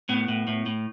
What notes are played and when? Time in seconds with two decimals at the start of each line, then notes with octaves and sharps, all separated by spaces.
0.09 A2 B3
0.28 A2
0.47 A2
0.66 A2